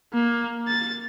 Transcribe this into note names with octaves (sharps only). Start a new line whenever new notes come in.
A#3
A6